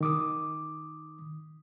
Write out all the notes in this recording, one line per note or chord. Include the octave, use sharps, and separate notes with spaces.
D#3 D6 D#6